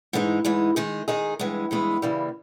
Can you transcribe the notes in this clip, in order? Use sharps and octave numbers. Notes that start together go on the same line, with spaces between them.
G#2 E3 G#3 D#4
G#2 E3 G#3 D#4
D#3 G#3 D#4 G#4
D#3 G#3 D#4 G#4
G2 E3 G#3 B3
G2 E3 G#3 B3
C#3 E3 G3 A#3